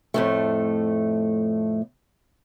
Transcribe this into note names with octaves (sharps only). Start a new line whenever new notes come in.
F2 A2 A3